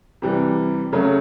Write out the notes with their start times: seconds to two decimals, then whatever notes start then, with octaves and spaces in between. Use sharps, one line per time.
0.22 C3 E3 G3
0.92 C#3 F#3 A3 C#4